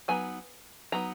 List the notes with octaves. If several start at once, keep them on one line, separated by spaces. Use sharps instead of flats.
F#3 B3 D#4 G#5
F#3 B3 D#4 A#5